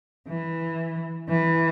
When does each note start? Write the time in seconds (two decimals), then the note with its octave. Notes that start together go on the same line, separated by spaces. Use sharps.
0.27 E3
1.28 E3